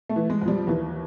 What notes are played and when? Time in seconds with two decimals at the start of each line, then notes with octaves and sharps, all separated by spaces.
0.09 A3
0.16 E3
0.30 G#3
0.42 F2
0.48 G3
0.67 D#2 E3